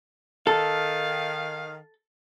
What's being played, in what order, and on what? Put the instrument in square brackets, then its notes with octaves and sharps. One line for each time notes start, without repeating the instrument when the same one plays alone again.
[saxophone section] D#3 F5 [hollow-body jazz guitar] A4